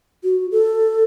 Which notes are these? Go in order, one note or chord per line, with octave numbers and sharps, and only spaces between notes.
F#4
A4